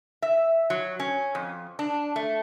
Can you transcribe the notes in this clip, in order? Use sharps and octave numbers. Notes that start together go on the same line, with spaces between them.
E5
F#3
C#4
F2
D4
A3